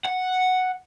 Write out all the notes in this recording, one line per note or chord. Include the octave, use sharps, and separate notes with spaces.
F#5